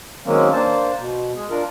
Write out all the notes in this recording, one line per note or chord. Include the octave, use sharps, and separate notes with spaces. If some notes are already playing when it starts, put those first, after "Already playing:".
D#3 F#3 G#3 A#3 C4 C#4
A#3 D4 C5 A5
B2
G#3 G#4
D4 F4 A#4